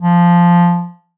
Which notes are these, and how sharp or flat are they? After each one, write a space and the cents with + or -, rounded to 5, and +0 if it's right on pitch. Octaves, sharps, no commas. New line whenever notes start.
F3 -5